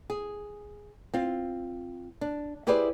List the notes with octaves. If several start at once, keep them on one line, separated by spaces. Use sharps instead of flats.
G#4
C4 F4
D4
E4 G4 G#4 B4 C5 D5